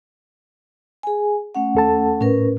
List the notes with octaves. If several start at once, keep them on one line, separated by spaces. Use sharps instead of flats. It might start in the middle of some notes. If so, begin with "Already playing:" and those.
G#4 G#5
A3 C#4 F#5
D#2 A4 A5
A2 C#4 A#4 B4